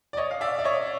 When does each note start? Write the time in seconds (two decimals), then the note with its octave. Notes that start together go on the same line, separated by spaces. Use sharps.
0.13 D5
0.17 C#5 D#5
0.31 F5
0.41 D5 E5
0.59 D5
0.64 C#5 D#5